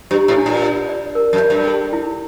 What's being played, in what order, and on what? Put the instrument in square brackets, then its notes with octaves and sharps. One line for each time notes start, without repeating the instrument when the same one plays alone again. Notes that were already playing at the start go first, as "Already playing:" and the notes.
[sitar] G2 [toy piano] G4
[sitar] A2
[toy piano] D4
[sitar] A#2
[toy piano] D5
D5
A#4
[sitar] F#2
[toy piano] D5
[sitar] G2
[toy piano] A4
E4